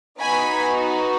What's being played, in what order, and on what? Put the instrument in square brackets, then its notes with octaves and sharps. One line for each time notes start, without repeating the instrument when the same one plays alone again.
[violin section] B3 D#4 F#4 G#5 B5